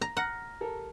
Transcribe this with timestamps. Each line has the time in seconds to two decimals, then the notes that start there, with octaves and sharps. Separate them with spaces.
0.01 A#5
0.17 F#5 A#5 F6 A#6
0.61 G4 A4 A#4